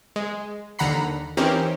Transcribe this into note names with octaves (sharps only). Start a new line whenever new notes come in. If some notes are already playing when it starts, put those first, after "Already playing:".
G#3
D#2 D3 F#5 A#5 B5 C7
E3 C4 C#4 D#4 G4 A#4